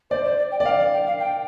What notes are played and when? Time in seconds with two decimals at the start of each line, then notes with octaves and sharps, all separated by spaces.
0.10 C5 D5
0.24 C5
0.38 D5
0.52 G5
0.60 D5
0.66 F5 G5
0.79 D5
0.93 G5
1.07 F5
1.20 G5